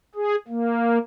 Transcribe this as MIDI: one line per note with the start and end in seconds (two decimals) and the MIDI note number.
0.15 0.36 68
0.48 0.98 58